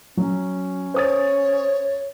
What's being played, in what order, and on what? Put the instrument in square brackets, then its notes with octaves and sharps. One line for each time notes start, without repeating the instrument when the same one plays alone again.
[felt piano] F#3 [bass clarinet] C#4
[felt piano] C5 D#6 A6 [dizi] C#5